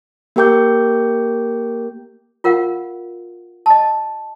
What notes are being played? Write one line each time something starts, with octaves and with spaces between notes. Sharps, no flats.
A#3 G4 A#4 G5 D6 G6
F4 A#4 F5 F#5
D#5 A5